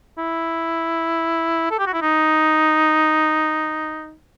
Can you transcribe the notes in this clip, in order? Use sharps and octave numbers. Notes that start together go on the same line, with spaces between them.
E4
A4
G4
F#4
E4
D#4